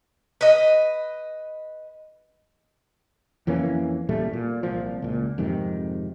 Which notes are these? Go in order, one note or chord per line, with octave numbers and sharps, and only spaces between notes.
B4 D#5
F2 E3 A#3 C#4
A1 A#2 G3 A3
A#2
C2 A#2 F3
C#2 A#2
F2 G#2 C3 D#3